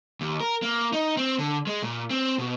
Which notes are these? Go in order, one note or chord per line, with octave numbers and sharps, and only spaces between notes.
D#2
A#4
A#3
D#4
C4
D3
G#3
A#2
C4
B2